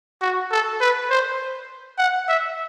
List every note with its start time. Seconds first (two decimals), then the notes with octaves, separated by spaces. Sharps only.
0.22 F#4
0.52 A4
0.81 B4
1.10 C5
1.98 F#5
2.28 E5